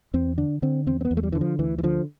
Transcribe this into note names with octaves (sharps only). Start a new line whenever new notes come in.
E2 C4
D3 D4
D3 C4
E2 C4
C4
B3
E2
A3
G3
D3 E3
F3
D2 E3
E3
D3 F3